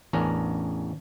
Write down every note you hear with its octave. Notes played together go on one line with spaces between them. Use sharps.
A1 E2 C#4 D4 A#4